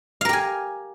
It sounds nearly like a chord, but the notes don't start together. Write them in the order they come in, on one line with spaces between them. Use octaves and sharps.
F5 A#4 G4 G#5